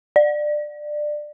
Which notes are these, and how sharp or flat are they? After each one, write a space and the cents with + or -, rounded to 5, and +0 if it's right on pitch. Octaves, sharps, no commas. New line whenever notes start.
D5 +20